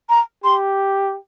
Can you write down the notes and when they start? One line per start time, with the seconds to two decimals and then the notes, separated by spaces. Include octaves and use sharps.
0.09 A#5
0.44 G4 C6